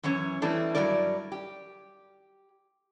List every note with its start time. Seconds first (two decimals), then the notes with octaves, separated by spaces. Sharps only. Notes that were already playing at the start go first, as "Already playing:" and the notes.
0.03 F#2 E3 C#4 C#5
0.42 E3 G3 A3 C4 D4
0.75 G2 C3 F#3 G3 A#4 D5
1.32 G4